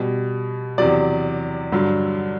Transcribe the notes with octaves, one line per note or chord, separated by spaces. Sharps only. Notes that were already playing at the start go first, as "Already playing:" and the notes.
Already playing: B2 G3
E2 C3 F#3 D5
G2 D3 F#3